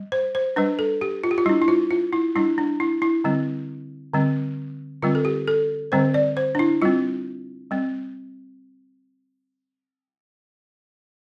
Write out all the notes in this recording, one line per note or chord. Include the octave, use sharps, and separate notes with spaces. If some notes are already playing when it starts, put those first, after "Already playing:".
Already playing: G3
C5
C5
G3 D4 B4
A4
G4
F4
G4
F4
G3 D4 E4
E4
F4
F4
E4
G3 D4 E4
D4
E4
E4
D3 G3 C4
D3 G3 C4
D3 G3 C4 F4
A4
G4
A4
D3 G3 C4 C5
D5
C5
D4
E4
G3 C4 F4
G3 C4